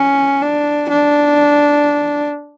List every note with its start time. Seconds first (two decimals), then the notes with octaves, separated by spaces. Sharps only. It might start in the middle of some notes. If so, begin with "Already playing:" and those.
Already playing: C#4
0.42 D4
0.89 D4